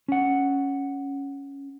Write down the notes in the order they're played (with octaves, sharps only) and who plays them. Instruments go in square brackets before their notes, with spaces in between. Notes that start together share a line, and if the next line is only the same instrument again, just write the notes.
[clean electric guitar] C#4 F#5